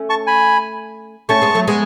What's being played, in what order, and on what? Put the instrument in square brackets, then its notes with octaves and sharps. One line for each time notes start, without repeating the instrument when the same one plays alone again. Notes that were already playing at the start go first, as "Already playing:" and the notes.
Already playing: [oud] A3 C#4
[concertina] A5 C#6
G#5 B5
[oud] A3 C#4 [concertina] A5 C#6
[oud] G#3 B3
F#3 A3
G#3 B3